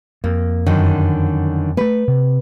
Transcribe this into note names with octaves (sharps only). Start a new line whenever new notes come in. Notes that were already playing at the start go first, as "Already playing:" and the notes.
F2 A#3
F#2 D3 D#3
A3 A#3 B4
C3